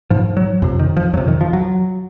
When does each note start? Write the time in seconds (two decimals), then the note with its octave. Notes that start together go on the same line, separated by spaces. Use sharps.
0.10 G#2 F3
0.37 F#3
0.62 F2 C3
0.79 D#3
0.97 F3
1.13 F2 F#3
1.17 C3
1.28 D#3
1.41 F3
1.53 F#3